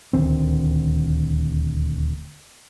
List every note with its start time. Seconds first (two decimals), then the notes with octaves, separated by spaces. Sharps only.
0.13 D#1 D2 D#3 C4